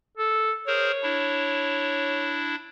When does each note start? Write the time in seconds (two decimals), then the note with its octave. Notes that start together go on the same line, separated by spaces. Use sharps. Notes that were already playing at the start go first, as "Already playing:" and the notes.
0.17 A4
0.67 G#4 A#4 C5 C#5
1.03 D4 E4